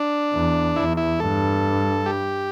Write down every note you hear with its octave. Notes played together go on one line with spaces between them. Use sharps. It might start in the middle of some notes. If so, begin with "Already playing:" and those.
Already playing: D4
E2
E2 E4
E4
G2 A4
G4